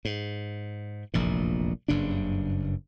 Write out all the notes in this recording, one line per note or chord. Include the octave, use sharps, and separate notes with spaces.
G#2
F1 A#1 E2 A#2
F#1 G2 C#3 D4